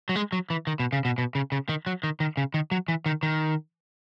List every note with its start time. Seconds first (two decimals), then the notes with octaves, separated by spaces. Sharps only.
0.09 F#3
0.16 G#3
0.32 F#3
0.50 E3
0.67 D#3
0.80 B2
0.93 C#3
1.05 B2
1.18 B2
1.35 C#3
1.52 C#3
1.69 D#3
1.87 F#3
2.03 D#3
2.20 D#3
2.37 C#3
2.54 D#3
2.71 F#3
2.88 E3
3.06 D#3
3.23 D#3